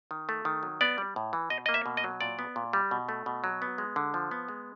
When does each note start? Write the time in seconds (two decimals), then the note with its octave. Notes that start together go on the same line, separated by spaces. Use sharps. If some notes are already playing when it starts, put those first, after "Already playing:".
0.11 D#3
0.29 A3
0.45 D#3
0.63 F#3
0.81 B3 D5
0.98 G3
1.16 A2
1.33 E3
1.50 B2 D#5
1.66 A#3 D#5
1.74 E5
1.86 B2
1.97 D#5
2.04 F#3
2.21 A#2 D5
2.39 B3
2.56 A#2
2.73 G3
2.91 B2
3.09 A3
3.26 B2
3.44 F#3
3.62 B3
3.78 G#3
3.96 D3
4.14 F3
4.31 B3
4.48 G#3